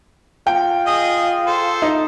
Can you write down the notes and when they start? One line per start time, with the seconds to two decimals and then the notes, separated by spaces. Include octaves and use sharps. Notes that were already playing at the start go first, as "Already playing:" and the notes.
0.47 F4 G5
0.86 G#4 D#5
1.46 A4 C5
1.82 D#4